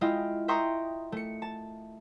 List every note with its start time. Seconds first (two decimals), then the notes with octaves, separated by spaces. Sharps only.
0.01 G#3 E4 F4 D#5 F5 G5
0.48 E5 G5 A#5 C6 C#6 D#6
1.12 A3 C#7
1.42 A5